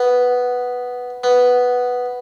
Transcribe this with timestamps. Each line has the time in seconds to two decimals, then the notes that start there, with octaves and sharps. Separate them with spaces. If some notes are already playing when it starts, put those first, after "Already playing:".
Already playing: B3
1.24 B3